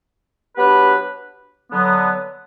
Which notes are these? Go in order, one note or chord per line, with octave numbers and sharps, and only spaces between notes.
F#3 B3 D4 G4 B4
D3 F#3 B3